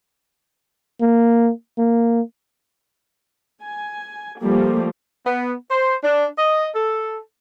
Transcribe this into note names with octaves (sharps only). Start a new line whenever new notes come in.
A#3
A#3
G#5
F3 G3 A3 A#3
B3
C5
D4
D#5
A4